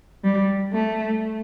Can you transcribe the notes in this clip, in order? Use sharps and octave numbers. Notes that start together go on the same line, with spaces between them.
G3
A3